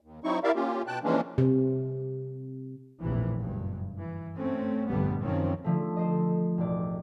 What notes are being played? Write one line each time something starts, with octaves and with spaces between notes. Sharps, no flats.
D#2
F#3 C4 D#4 E4 C#6
E4 G4 A#4 D5 E5 F5
A#3 C#4 F4 G4
B2 G5 A5 F#6
E3 F3 G#3 A#3 C#4 D4
C3
F1 A#1 A2 C3 E3
F#1 G2
E3
A3 C4 C#4
F1 A#1 G2 D3 G3 B3
F#2 D#3 F3 C4 C#4
D3 F3 A3
A4 C5 D#5
E1 A1 D5